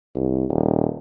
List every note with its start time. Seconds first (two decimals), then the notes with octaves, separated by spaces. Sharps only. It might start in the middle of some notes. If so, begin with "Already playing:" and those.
0.15 C2
0.49 D#1